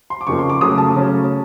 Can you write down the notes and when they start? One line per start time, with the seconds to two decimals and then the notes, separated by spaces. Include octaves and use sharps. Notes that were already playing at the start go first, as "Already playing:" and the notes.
0.10 C6
0.21 D6
0.27 F2 C#3 F3 A#3 C#6
0.39 C6
0.50 D6
0.61 C#3 F#3 A3 C#4 D#6
0.78 A5
0.95 C#3 F#3 A3 C#4